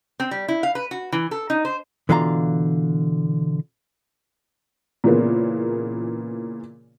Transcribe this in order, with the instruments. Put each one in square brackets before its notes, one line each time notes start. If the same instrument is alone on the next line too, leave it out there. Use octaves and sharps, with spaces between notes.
[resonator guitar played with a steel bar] C4
G3
E4
F5
B4
F#4
E3
A4
D#4
C5
[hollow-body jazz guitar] B2 D3 E3 F4 F5 A#5
[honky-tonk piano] A#2 C#3 E3 A#3 B3